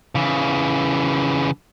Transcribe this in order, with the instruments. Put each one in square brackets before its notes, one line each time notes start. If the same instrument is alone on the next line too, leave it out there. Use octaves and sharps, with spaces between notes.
[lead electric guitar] C#3 E3